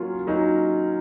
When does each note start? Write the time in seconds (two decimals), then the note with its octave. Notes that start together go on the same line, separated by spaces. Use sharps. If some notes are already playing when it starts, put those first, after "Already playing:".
Already playing: F#3 A#3 C#4 F4
0.27 F#3 A#3 C#4 D#4